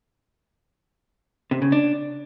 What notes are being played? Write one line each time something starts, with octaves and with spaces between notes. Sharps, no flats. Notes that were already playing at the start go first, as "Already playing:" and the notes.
C3
C#3
D4